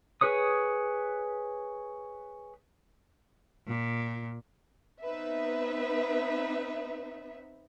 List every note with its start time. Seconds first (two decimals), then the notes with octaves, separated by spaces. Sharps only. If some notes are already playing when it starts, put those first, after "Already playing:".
0.21 G#4 B4 C#5 D#6
3.67 A#2
5.03 B3 C4 D#4 B4 E5